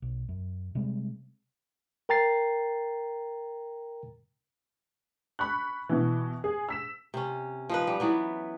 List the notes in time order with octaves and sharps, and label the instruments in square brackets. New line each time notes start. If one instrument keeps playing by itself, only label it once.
[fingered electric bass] B1
F#2
C3 G3 G#3 C4
[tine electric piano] A#4 G5 A#5 A6 C7
[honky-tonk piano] B5 C#6 F#6
B2 E3
G#4
E6 B6 E7
[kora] C3 C#4
F3 D#4 B4
G3
E3 F#3 B3